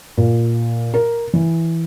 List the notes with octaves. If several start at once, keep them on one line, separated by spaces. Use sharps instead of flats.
A#2
A#4
E3